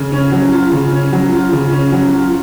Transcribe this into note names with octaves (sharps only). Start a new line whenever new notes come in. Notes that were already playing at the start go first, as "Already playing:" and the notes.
Already playing: C#3
C#4
F#3
F4
C#3
C#4
F#3
F4
C#3
C#4
F#3
F4